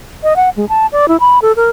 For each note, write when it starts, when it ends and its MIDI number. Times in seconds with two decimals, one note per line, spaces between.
0.23 0.36 75
0.36 0.50 78
0.57 0.68 56
0.69 0.87 81
0.92 1.08 74
1.08 1.17 64
1.20 1.39 83
1.42 1.52 69
1.56 1.70 70